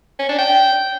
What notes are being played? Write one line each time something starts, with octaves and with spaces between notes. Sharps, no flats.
C#4
D4
G5